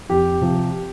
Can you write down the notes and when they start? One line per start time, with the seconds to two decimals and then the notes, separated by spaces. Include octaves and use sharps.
0.10 F2 G4
0.41 C3 F3